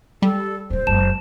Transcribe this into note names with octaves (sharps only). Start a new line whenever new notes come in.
G3 A4
D1 D4 C5
F#1 G#3 A5 E7